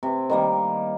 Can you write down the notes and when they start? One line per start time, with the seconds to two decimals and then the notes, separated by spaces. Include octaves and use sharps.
0.03 C3
0.30 D#3 G3 A#3